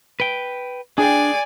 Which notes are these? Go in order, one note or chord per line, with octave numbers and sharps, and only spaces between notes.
B4 G5
D4 G#4 D5 G5 G#5